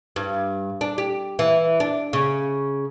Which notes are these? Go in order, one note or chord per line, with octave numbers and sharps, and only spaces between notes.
G2
D4
G4
E3
D4
C#3